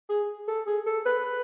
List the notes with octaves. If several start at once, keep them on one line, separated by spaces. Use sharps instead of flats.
G#4
A4
G#4
A4
B4